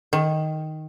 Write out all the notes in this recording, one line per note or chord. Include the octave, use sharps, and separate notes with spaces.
D#3